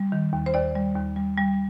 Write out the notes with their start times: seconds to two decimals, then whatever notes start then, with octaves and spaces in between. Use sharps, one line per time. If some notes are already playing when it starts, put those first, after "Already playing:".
Already playing: G3
0.12 D#3
0.33 D#2
0.46 C5
0.54 D#2 D5
0.75 G3
0.95 D#2
1.16 G3
1.38 G3